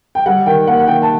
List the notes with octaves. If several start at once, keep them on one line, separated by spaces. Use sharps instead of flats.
G5
G3 F#5
D#3 G5
A#3 F#5
F#5
D#3 G5
A5